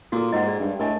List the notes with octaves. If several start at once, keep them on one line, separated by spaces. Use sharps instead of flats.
A#2 F#4 A4
G#2 D#5 F#5
G#4 D5
G2
A2 A#4 D#5 G#5